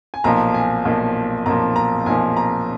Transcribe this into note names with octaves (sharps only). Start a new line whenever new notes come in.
G#5
B1 A#2 F3 A#5
G#5
B1 A#2 F3
B1 A#2 F3 A#5
A#5
B1 A#2 F3 G#5
A#5